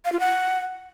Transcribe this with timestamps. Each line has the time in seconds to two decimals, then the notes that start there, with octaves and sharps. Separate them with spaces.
0.05 F5
0.12 F4
0.20 F#5